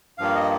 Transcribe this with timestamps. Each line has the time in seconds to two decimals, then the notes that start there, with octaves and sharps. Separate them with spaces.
0.18 G2 F3 A#3 F5
0.35 D#5